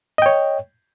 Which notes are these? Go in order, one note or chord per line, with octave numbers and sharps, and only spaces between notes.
C#5 D#5 G5